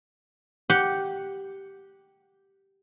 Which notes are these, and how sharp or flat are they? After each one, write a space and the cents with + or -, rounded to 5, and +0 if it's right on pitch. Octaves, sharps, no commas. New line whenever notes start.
G4 -5 F#5 +0